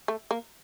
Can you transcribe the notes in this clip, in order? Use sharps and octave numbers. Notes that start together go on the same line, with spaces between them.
A3
A#3